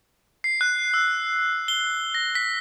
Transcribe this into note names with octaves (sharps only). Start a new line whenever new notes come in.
C7
F#6
E6
G7
A#6
B6